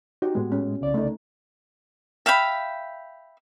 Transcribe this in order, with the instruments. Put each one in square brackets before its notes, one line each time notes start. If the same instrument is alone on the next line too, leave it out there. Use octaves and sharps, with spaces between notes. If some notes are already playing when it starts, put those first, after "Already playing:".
[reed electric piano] D#4 [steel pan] F#4 G4 C#5
[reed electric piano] A2 G#3 [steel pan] B3
[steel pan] C#4
[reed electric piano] C2 C#3 D5
[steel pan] A3 D#4
[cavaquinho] E5 F5 G5 B5